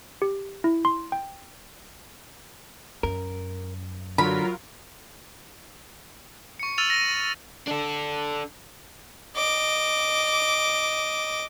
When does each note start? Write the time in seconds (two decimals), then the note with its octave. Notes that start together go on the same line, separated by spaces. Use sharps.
0.22 G4
0.64 E4
0.85 C6
1.12 G5
3.03 F#2 A#4
4.18 D3 F#3 F4 A#4 B5
6.60 C#6 C#7
6.78 E6 F6 A6 D#7 F7
6.90 A#6 D#7
7.67 D4 A4
9.37 D#5 D6